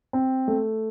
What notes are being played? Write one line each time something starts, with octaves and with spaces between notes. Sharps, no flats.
C4
A3